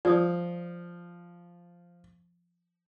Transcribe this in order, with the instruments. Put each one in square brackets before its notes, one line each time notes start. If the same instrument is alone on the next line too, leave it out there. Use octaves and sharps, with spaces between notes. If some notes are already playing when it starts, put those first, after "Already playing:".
[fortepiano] F3 [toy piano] D5 D#6